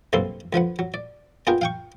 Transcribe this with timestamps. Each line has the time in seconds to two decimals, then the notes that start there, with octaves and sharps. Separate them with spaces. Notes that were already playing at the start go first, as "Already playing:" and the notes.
0.13 B1 G2 C3 A#3 A4 C6
0.53 D2 F3 B4 F#5
0.79 F#3
0.94 D5
1.47 B3 D4 F4 G#4 A#4 G5
1.61 F5 G5 C#6